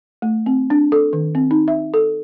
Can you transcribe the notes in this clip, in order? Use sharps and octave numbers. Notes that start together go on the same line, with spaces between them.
A3
C4
D4
A4
D#3
C4
D#4
E5
A4